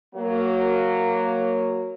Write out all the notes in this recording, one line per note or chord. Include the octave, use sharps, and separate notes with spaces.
F#3 A#3